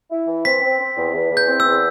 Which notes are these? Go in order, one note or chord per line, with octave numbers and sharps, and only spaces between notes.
E4
E3
C4 B6
C4
C4
E2
E2
E2
G6
C4
E6
E2